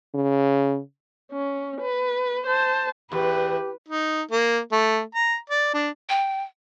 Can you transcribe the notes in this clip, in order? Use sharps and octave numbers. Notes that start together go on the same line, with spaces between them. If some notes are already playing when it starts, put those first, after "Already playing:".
C#3
C#4
B4
C5 A5
E2 G4 B4
D#4
A#3
A3
A#5
D5
D4
G5